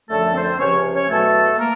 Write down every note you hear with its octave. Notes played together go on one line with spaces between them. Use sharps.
F#2 D3 F3 A3 A4
C4 C5
C#2 C3 F3 C#4 C#5
C#4 C#5
E2 B2 F#3 A3 A4
A#3 A#4